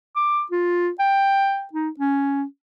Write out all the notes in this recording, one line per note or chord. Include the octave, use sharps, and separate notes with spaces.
D6
F4
G5
D#4
C#4